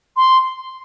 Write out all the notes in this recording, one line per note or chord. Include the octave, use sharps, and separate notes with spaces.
C6